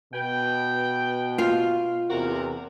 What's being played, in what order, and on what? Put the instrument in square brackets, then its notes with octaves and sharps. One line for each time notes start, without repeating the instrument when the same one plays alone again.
[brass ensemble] B2 [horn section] B4 G5
[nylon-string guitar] F4 F5
[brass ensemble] E2 C3 [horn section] F#4 A#4